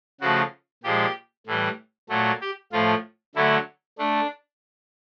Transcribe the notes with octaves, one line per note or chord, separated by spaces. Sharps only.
C#3 F3 A3 F#4
A#2 F3 G#3 G4
A2 E3 G3
A#2 F#3 A3
G4
A2 F3 A3 F4
D3 F#3 A3 E4
A3 D4